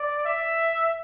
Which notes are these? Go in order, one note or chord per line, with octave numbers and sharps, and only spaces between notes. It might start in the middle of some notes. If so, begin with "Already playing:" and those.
Already playing: D5
E5